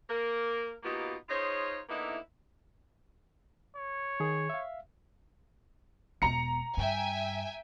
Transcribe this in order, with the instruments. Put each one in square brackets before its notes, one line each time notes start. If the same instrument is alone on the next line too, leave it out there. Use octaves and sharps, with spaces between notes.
[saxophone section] A#3 A#4
B2 A#3 B3 D#4 F4 G4
D#4 F4 G#4 C5 C#5
D3 A#3 B3 D#4 E4
[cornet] C#5
[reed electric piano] D#3 G#4
E5 F5
[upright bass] E1 B3 [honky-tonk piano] A#5 C#7
[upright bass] G2 [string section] E5 G5 G#5